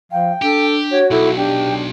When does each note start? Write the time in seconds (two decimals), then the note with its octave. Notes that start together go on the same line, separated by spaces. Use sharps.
0.12 F3 F5 G5
0.42 D4 G4 A4
0.91 F#4 C#5
1.11 B1 E4 A4
1.37 D4 G4 G5